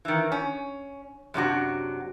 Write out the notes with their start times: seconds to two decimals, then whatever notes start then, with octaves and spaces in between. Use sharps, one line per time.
0.05 D#3 E3
0.32 C#4
1.34 F#2 C3 D4 F#4